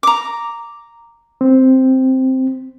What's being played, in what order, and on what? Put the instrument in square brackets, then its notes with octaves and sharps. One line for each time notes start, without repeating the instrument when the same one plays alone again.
[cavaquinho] A#5 D6
[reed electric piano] C4